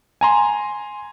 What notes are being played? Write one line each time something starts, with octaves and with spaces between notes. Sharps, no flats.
G#5 A#5 C6